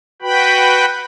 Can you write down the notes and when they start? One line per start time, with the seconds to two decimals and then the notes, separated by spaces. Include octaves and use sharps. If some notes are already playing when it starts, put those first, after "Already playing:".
0.22 F#4 B4 G5 B5